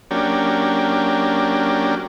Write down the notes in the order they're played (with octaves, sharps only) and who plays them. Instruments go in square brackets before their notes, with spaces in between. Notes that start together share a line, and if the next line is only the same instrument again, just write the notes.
[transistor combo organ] F#3 A#3 C#4 D4 G4